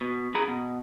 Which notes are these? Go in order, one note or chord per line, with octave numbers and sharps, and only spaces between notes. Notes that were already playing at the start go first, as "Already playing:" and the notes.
B2
F#2 G#4 A#5 B5
B2